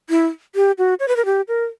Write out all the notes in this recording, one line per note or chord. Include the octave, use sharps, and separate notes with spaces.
E4
G4
F#4
C#5
B4
A#4
G4
A#4